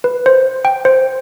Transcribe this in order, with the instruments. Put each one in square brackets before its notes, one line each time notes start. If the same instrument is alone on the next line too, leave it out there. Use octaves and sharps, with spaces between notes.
[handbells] B4
C5
G5
C5